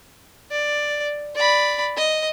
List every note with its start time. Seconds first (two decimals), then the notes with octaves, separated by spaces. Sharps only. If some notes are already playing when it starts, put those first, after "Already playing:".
0.51 D5
1.35 D5 B5
1.97 D#5